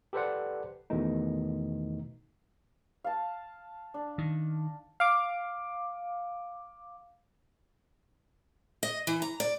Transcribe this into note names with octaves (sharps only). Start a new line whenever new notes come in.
G4 A4 B4 C5 D5 F#5
E2 B2 D#3 E3 A3 D#4
F5 A5
D4
D#3
F5 D6
D#5
E3
A#5
D5